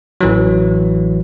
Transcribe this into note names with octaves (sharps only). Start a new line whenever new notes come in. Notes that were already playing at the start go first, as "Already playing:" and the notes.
A1 E3 F#3